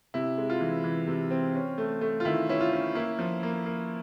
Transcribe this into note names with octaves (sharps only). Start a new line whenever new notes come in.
C3 E4
G#3
F4
E3
E3
C3
C4
C#4
A3
A3
F4
D#3 E4
C#4 E4
F4
C#4
A#3 E4
F3
A#3
A#3